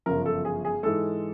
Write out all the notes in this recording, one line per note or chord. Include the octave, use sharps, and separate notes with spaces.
G1 F#2 C#3 F3 A#4
A4
G#4
G#4
G#2 E3 G#3 A4